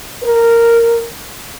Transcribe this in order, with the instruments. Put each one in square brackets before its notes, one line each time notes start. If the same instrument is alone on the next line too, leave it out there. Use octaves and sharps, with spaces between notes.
[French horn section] A#4